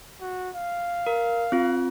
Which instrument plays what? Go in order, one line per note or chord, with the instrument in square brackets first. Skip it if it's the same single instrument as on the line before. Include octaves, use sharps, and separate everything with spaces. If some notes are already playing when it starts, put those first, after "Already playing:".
[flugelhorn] F#4
F5
[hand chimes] A#4
C4 F4